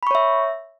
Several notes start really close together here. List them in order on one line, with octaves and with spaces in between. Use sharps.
B5 C#6 C#5 E5